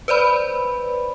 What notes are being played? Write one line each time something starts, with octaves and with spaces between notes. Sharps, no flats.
B4 C5 D5 B5